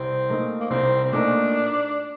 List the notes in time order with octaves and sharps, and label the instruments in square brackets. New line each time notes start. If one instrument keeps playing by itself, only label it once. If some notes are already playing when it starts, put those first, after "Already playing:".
Already playing: [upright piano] C2 [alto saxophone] C4
[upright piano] A#2 A3 D#4 A#4
[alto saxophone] A#3
[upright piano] C2 [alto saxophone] C4
[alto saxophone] C4
[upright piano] A#2 A3 D#4 A#4 [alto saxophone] D4